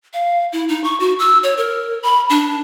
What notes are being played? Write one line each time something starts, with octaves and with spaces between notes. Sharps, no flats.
F5
E4
D#4
C#6
F#4
E6
C#5
A#4
B5
D4